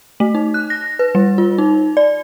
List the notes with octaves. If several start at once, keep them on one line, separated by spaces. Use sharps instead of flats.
A3
D#4
F#6
A#6
B4
G3
F4
D#4
D5